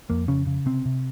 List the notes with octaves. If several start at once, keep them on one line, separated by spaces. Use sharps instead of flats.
F2 A#3
C#3 C#4
C#3
C3 C4
C3